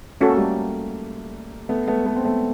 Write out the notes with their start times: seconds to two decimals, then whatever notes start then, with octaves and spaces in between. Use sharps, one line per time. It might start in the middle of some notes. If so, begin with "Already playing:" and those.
0.20 A3 C#4 F#4 A4
0.29 A#3
0.37 G3 A3
1.69 A3 B3
1.88 A3 B3
2.06 A3 B3
2.16 C4
2.24 A3 B3